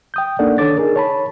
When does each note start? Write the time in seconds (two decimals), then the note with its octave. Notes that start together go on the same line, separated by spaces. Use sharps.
0.14 G5 D#6 G6
0.39 A#3 D4 D#4 A4 D5 F#5
0.58 D#3 D4 A4 C#5 D6 A6
0.78 D#4 G#4 A#4
0.96 C#5 A5 B5